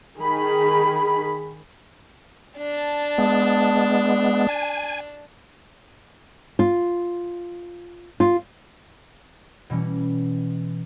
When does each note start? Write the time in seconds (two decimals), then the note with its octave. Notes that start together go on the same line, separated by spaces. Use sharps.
0.19 D#3 G#4 B5
2.57 D4 A5
3.18 G#3 B3
4.49 G#5
6.59 F4
8.20 F4
9.70 B2 E3 G3 C#4